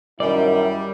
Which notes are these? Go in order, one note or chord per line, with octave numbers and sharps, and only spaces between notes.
F#2 D#3 G3 E4 D5